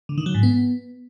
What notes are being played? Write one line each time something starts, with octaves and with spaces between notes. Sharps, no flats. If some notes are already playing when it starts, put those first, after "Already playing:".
D3
D#3
F#3
G#2
B3